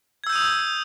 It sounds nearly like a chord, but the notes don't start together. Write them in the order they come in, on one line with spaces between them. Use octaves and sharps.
G#6 E6 G6 D#7 D#6